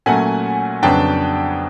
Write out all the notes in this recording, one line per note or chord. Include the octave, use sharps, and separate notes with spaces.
A#2 F#3 A3 C#4 F#5 G#5
F2 C#3 F#3 B3 D4 G5 A5